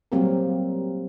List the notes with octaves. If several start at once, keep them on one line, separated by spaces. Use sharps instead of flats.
F#3 G3 A#3 C4 G4 A#4